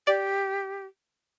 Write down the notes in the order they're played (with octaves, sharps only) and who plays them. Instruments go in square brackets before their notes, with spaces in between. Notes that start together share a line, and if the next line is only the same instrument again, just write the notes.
[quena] G4 [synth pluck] D5